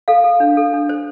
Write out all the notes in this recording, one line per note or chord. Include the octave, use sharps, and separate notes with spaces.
A4 F5
A4
D4
A4
D4
C5